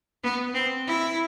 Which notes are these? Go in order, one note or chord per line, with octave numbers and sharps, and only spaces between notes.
B3
C4
E4